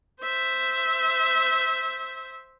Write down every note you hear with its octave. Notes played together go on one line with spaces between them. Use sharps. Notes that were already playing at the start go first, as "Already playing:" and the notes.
C5 E5